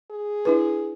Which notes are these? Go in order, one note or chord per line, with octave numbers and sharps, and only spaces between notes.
G#4
D4 E4 B4